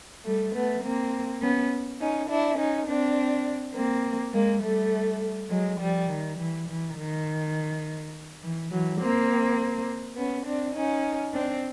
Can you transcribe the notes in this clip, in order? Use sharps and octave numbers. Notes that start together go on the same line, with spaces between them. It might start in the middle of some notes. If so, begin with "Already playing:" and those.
G3 A3
A3 B3
A#3 C4
B3 C#4
C#4 D#4
D4 E4
C#4 D#4
C4 D4
A#3 C4
G#3 A#3
G3 A3
F#3 G#3
F3 G3
D#3
E3
E3
D#3
E3
E3 F#3
A#3 C4
B3 C#4
C4 D4
C#4 D#4
C4 D4